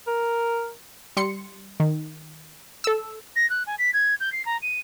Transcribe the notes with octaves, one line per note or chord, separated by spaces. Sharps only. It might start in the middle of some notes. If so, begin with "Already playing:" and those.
A#4
G3 C6 C#7
D#3
A4 E6
A#6
F#6
G#5
B6
G#6
G6
C7
A#5
D#7